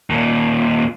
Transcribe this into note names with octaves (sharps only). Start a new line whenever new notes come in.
D#2 A#2